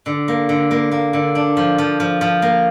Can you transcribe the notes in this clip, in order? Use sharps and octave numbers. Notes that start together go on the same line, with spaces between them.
D3
A#3
D3
A#3
A#3
D3
D4
F3
F3
F3
F3
A#3